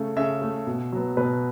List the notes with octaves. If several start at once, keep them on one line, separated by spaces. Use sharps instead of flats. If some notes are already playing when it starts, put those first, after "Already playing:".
Already playing: C#3 A3
C#3 E5
A3
B2
F#3 B3
B2 B4